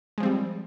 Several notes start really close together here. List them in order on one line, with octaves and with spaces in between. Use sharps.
G#3 F3 C4 G3